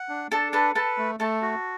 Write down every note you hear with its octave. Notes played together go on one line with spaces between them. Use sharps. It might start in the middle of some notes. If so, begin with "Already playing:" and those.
Already playing: F#5
D4
D4 A4 A5
A4 B4 A5
A4 B4 A5
A3
A3 A4 A5
F#4